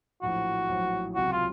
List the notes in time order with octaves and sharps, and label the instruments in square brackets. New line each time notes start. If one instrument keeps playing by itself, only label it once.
[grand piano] A#1 A2 F#3 [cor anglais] F#4
[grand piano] A#1 A2 F#3
[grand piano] C#2 C3 F#3 C4 [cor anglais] F#4
[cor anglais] F4